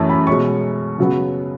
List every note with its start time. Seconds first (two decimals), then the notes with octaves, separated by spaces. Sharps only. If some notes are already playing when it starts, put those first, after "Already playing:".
Already playing: F#2 E3 A3 C#4 A5
0.09 B5
0.27 B2 G#3 C#4 C#6
0.98 C#3 F#3 B3